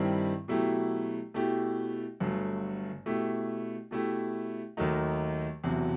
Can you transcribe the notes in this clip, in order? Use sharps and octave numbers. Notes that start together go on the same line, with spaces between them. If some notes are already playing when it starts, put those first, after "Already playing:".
Already playing: G2 D#3 G3 C4 E4
B2 F#3 A3 E4 G4
B2 A3 E4 G4
G1 G2 F#3 A3
B2 A3 E4 G4
B2 A3 E4 G4
D#2 D#3 F#3 A3 D#4
E1 E2 C3 F#3